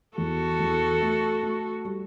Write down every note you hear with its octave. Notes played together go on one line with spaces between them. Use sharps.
E2 F#4 A4
E2
A3
A3
G3